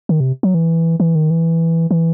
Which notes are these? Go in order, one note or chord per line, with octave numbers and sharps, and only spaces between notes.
D#3
C3
F#3
E3
E3
D#3
E3
E3